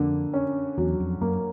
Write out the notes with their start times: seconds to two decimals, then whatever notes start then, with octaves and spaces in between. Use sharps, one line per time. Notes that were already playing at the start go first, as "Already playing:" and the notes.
Already playing: F2 D3 A#3
0.34 C#4
0.78 E2 F#3
1.00 F2
1.21 F#2 A#3